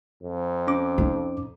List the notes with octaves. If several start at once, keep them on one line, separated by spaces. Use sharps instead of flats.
F2
C#4 D6
D#4